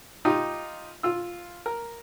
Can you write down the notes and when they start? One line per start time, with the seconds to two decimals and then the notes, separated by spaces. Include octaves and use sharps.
0.25 D#4 F4 G4
1.03 F4 E6
1.66 A#4